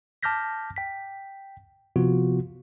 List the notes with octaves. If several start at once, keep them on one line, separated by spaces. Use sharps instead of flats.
A5 D6 F6 G6 A#6 B6
G5 B6
C3 F3 B3 F4 F#4